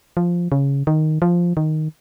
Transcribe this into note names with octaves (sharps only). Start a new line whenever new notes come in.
F3
C#3
D#3
F3
D#3